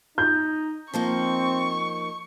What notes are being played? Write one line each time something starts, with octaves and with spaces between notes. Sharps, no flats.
D#4 G6
F3 A#3 C4 D#4 C#6